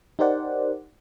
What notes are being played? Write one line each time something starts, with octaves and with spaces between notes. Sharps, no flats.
D#4 G4 A#4 C5 D5 F#5